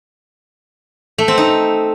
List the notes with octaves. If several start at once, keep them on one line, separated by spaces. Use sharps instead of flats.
A3
C4
D#4